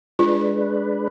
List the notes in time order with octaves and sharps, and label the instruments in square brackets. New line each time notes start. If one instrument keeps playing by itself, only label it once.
[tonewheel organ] G#3 D4 B4 [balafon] F4